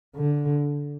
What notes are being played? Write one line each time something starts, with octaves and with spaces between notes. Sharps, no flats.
D3